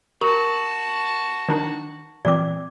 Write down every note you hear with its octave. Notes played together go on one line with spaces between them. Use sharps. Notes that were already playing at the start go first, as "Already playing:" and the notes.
F#4 A#4 A5 A#5 C#6
D#3 D4 D#4
A#2 E3 C4 D5 D6